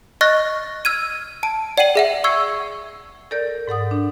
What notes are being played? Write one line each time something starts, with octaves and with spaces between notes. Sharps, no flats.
D#5 C#6 F6 F#6 A6 A#6
E6 F6 G#6 D#7
A5 D7
D5 F#5 G5 C7 D#7 F#7
G#4 E5 F#5
C#6 E6 G#6 C7 C#7
A4 A#4 D5 G6
G#2 A4 F#5 D#6
D4